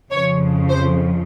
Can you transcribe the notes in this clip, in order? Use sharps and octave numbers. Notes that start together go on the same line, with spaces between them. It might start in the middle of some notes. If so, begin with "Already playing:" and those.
F2 C#3 F3 C#5
C5